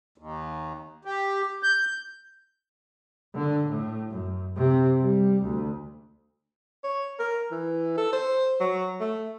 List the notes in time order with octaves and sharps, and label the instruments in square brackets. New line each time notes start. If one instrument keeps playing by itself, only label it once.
[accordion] D#2
G4
G6
[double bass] D3
A2
F#2
C3
G3
D2
[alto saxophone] C#5
A#4
E3
A4
C5
F#3
A3